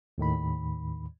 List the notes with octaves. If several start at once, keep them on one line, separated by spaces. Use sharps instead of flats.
D#2 A2 D#3 B5